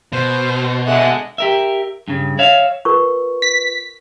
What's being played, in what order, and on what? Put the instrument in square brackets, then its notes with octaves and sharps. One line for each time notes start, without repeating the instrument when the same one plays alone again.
[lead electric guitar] B2 [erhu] C5
[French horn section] D3 G#3 [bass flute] E5 [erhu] F#5
[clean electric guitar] G4 A#4 E5
G2 C#3
C#5 E5 F5
[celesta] F4 B4 [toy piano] A#4 C#6
[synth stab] B6